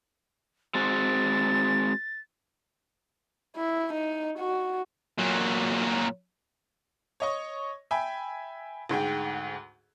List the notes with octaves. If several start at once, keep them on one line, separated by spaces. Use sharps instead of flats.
G#3 C4 F#4 A6
E4
D#4
F#4
A#2 F#3
C#5 D#5 C#6
E5 G5 G#5 B5
D2 G#2 G#4 G5